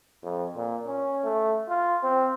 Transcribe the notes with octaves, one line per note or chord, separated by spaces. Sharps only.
F2
A#2
C#4
A3
F4
C4